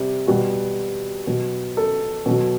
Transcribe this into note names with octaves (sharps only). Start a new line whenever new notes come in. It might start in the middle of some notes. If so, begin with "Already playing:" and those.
Already playing: C3 G3
B2 G3 F#4
B2 F#3
A4
B2 F#3